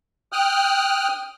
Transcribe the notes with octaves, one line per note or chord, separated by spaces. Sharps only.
G5 D#6 F6 F#6